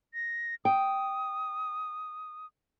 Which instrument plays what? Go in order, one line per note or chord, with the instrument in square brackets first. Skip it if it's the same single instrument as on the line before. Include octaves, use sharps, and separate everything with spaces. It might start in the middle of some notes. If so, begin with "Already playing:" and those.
[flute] A#6
[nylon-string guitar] G5 [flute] D#6